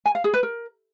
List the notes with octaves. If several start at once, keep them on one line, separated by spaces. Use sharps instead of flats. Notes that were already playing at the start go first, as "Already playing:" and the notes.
G#5
F5
G#4
B4
A#4